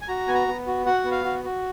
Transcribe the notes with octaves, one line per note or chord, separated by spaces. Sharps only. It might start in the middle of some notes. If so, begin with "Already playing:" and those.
G#5
F#4 A#5
B3 G#5
A#5
B3
F#4
F#4 F#5
B3
F5
F#4
F#4